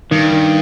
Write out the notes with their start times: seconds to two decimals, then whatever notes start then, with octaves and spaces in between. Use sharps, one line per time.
0.11 G2 D#3
0.32 D#3